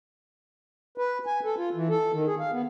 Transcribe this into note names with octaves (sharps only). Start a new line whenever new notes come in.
B4
G#5
A4
F4
E3
A4
D#3
G#4
F5
B3